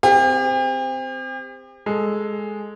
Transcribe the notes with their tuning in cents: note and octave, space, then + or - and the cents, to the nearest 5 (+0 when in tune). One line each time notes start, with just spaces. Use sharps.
C4 -10 G4 +40
G#3 +0 A4 -10